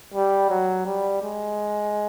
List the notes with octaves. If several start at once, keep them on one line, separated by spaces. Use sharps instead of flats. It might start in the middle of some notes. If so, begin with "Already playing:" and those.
G3
F#3
G3
G#3